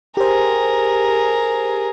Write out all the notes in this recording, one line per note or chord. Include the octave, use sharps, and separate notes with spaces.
G4 G#4 A#4 C5